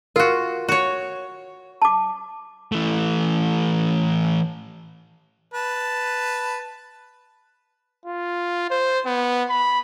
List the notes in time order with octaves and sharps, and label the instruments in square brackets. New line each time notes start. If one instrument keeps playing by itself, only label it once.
[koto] F4 F#4 [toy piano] A#4
[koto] F#4 C#5
[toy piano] A5 D6
[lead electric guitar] E3 A3
[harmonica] B4 A5
[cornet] F4
C5
B3
B5